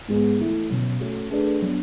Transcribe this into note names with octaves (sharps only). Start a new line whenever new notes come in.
G#2 G#3 B3
E3 A3 E4
B2 F#3 C#4
A3 C#4 F#4
A3 D4 G#4 B4 D5
F#3 B3 D4